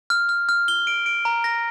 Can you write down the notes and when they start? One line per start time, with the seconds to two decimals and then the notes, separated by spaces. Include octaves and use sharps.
0.10 F6
0.29 F6
0.49 F6
0.68 G7
0.87 D7
1.06 D7
1.25 A#5
1.44 A#6